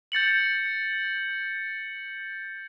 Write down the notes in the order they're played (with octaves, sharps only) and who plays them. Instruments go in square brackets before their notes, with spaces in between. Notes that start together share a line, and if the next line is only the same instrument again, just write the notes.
[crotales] G6 A6 C#7 F#7